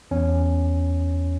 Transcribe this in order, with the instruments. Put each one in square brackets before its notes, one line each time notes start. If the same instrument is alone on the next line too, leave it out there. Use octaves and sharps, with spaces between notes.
[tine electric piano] E2 C#4